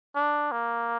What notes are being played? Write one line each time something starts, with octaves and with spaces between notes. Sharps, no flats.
D4
A#3